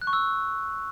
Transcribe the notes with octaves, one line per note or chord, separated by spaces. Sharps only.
F#6
C#6
E6